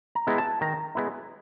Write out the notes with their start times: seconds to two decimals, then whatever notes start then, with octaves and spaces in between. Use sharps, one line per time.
0.15 A#5
0.27 G#3 B3 E4
0.38 A5
0.61 D#3 A#5
0.95 G#3 B3 E4